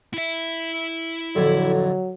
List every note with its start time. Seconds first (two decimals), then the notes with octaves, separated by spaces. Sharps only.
0.14 E4 E5
1.36 F2 A2 D3 F#3